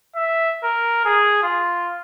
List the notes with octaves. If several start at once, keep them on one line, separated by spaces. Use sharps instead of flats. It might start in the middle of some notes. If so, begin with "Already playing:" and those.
E5
A#4
G#4
F4